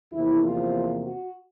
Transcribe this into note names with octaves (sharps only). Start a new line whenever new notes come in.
E2 C3 F3 A#3 E4
F4
F#4